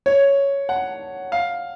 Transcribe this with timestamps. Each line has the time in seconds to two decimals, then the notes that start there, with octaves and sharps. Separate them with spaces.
0.06 C#5
0.69 F#5
1.32 F5